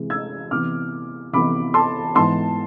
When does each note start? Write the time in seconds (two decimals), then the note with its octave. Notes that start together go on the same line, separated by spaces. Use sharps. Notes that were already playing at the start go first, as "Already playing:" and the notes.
Already playing: C3 E3 G#3
0.10 E6 G#6
0.51 C3 E3 B3 D6 F6
1.33 C3 E3 B3 B5 D6
1.74 A5 C6
2.15 G#2 E3 B3 A5 C6